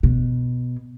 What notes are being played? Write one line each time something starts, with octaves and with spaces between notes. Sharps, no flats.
B2